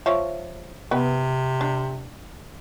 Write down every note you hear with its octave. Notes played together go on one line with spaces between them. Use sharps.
F3 C#5 E5
C3 B3 B4
D4